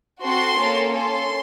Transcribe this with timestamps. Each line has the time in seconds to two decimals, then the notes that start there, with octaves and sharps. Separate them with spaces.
0.23 C4 F#4 A4 C6
0.58 A#3 C#4 A4
0.94 C#4 A4 C6